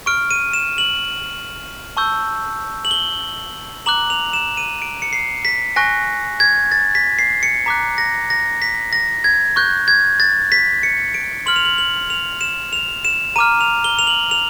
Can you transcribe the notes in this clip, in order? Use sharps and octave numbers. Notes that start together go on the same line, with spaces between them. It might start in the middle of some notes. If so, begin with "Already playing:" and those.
C#6 F6 D7
D#7
E7
F#7
A5 C#6 E6 G6
F#7
G7
A#5 D6 F#6 F#7
F7
E7
D#7
D7
C#7
C7
B6
G#5 C#6 F#6 A#6
G#6
A6
B6
C7
C#7
A#5 D6 F#6 B6
A#6
A#6
B6
A#6
G#6
C#6 F#6 G6
G#6
A6
B6
C#7
D7
C6 F6 F#7
F7
F#7
F#7
F7
E7
F7
E7
A#5 D6 F6 D#7
F7
G7
F7
F#7
F7